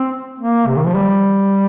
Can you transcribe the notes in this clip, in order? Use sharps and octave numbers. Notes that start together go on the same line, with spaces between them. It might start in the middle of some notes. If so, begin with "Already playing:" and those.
Already playing: C4
A#3
C3
D#3
F3
G3